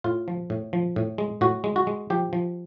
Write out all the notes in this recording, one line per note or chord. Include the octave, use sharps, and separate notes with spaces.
A2 F4
F3
A2
F3
A2
G#3
A2 F#4
G#3
F#4
G#3
F3 G4
F3